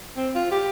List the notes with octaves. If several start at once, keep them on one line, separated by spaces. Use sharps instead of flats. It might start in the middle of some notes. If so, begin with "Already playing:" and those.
C4
F4
G4